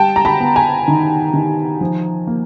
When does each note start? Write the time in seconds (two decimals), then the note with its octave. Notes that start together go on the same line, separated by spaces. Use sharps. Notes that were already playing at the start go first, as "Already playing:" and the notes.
Already playing: G3 G5 A5
0.16 A#5
0.25 A5 B5
0.40 B3
0.56 G#5 A#5
0.88 D#3
1.34 D#3
1.81 F3
2.27 A#3